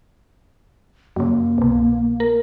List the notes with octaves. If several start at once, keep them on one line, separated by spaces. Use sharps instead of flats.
F#2 C#3 A#3
C2 B2
A#4